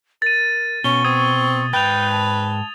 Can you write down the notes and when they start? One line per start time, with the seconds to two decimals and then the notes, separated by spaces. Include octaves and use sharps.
0.22 A#4 A6 D#7
0.84 B2 C#4 C#6 G7
1.04 C4 D#6 G#6 D#7
1.73 G#2 B4 G5 G6 A6 F7
2.10 A5